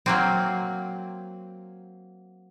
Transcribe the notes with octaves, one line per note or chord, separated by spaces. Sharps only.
F#3 A#3 C4